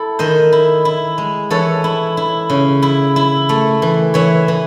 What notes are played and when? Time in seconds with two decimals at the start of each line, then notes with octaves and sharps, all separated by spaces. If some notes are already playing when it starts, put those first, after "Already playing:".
Already playing: E4 A4
0.19 D#3 C5 D#5
0.52 E4
0.85 E4
1.18 G#3
1.50 E3 A4 C#5
1.84 E4
2.17 E4
2.50 C#3
2.82 E4
3.16 E4
3.49 A3
3.82 E3
4.14 E3 C#5 E5
4.48 E3